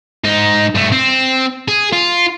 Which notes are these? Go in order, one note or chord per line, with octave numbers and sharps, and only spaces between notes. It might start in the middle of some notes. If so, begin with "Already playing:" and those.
G#2 D#4
G2 A3
C4
G#4
F4